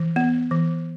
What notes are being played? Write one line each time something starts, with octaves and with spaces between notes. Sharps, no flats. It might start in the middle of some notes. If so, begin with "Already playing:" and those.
Already playing: E3
B3
E3